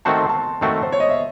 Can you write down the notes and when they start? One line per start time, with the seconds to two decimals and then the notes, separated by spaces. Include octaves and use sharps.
0.05 D#3 A3 C4 F#4 C5 A5
0.17 C6
0.29 A5
0.61 D#3 A3 C4 F#4 C5 A5
0.82 C5
0.92 C#5
1.00 D#5
1.09 E5